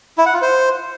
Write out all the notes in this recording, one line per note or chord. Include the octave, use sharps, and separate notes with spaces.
E4
F#5
F4
C5